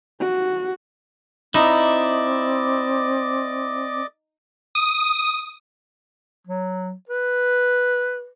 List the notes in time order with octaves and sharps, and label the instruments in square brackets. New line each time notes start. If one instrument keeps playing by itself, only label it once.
[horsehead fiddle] F#4
[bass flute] C4 [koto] D#4 [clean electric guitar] E4 [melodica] D5 D#5 D6
[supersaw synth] D#6
[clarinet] F#3
B4